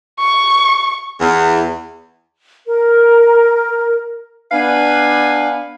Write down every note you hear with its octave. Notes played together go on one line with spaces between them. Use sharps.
C#6
E2
A#4
B3 D4 B4 F5 G#5